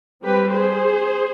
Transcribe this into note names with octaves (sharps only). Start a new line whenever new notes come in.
G3 C4 G4 B4
G#4 C5